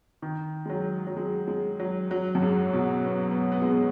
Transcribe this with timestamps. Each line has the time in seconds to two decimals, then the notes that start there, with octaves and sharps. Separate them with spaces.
0.22 D#3
0.66 G#3
0.70 F#3
1.07 F#3
1.17 G#3
1.48 G#3
1.80 F#3
2.11 F#3
2.35 F#2
2.42 G#2
2.73 B2
3.05 B3
3.31 B3
3.52 B3
3.62 G#3
3.72 B3